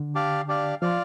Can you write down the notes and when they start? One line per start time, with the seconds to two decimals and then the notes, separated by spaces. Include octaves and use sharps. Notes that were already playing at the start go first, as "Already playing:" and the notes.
Already playing: D3
0.15 D4 G4 D5 F5
0.48 D4 G4 D5 F5
0.81 F3 F4 D5 F5